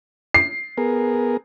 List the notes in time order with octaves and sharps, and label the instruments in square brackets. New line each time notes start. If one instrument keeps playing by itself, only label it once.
[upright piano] C7
[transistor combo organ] B3 G#4 A#4